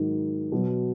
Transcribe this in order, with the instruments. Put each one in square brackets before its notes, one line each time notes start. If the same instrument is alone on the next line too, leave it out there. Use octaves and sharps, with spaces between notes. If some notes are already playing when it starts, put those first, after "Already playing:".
Already playing: [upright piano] G#2 D#3 F#3
B2 F#3